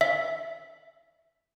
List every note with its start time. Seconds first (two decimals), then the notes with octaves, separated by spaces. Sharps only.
0.01 E5